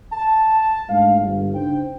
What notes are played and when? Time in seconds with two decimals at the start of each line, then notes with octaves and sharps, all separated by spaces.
0.13 A5
0.90 G#2 G#3 A3 D4 F5
1.21 G1
1.55 C#3 D4 D#4 C5 G5